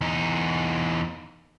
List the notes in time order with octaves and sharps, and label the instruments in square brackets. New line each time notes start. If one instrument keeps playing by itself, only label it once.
[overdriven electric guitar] E2 D#4